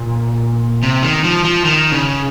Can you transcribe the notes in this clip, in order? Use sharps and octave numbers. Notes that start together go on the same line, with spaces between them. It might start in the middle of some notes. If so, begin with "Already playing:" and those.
Already playing: A#2
C3
D#3
F3
F3
D#3
C#3